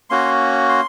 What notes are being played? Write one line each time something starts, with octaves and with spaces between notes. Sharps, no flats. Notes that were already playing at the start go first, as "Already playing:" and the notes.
A#3 C#4 F#4 C6
C6